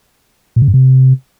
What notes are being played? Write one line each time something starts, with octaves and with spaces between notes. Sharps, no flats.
A#2
C#3
G2
C3